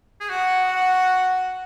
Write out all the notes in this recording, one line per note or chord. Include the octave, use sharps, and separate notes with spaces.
G#4
F#4 F#5
F#5